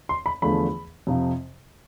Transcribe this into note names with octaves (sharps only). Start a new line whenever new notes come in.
C6
B5
E2 D3 F3 A3 B5
F2 C3 F3